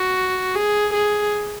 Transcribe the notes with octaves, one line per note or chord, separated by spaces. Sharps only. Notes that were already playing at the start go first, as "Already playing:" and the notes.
Already playing: F#4
G#4
G#4